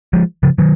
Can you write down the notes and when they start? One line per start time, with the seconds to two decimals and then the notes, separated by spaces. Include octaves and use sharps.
0.13 F3 G#3
0.43 C#3 F3
0.58 D#3 F#3